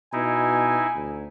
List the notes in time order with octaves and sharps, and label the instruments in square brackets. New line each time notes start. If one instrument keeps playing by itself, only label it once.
[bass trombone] B2 [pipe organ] D#4 E4 [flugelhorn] G#5
[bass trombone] D2